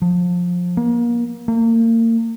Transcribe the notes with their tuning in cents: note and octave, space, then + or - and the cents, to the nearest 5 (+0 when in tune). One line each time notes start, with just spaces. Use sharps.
F3 +20
A#3 +30
A#3 -35